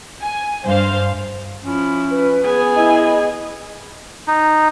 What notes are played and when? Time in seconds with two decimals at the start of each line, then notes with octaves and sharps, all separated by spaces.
0.21 G#5
0.64 G2 C5 F5
1.64 F3 C#4 E4
2.10 B4
2.45 B3 G#4 G#5
2.76 E4 D#5
4.28 D#4